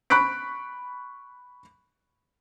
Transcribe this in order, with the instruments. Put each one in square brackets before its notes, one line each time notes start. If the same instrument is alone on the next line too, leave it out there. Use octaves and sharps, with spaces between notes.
[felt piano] B5 C#6 F#6 B6 D7